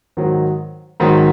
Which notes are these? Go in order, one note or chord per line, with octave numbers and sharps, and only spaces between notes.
G#2 D#3 F#3
G#2 D#3 F#3